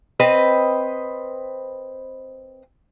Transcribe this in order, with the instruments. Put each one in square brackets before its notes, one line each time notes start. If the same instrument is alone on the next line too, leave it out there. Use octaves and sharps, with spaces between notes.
[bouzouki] C4 B4 D#5